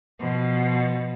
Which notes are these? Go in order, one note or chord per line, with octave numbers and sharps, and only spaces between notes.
B2 F3